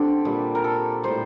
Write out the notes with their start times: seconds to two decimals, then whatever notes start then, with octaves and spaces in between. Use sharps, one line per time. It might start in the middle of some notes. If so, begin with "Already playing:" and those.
Already playing: D3 C4 D4 G4 A4
0.25 A#2 G3
0.55 A#4
0.64 A4
1.03 A2 G3 C5